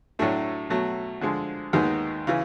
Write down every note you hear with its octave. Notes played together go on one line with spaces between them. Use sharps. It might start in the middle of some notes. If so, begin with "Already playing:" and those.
A2 F#3 A3 D4
B2 F#3 A3
D3 F3 G#3
D#2 D#3 G#3 B3 D#4
C#3 E3